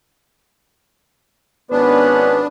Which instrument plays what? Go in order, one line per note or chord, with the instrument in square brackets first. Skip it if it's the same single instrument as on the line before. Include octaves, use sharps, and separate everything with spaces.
[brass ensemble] G#1 C#4 B4 [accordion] B3 D4